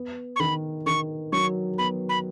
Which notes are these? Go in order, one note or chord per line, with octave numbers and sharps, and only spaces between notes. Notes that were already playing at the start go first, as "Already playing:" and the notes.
Already playing: B3
C#6
D#3 B5
D#3 C#6
F#3 C#6
B3 B5
B5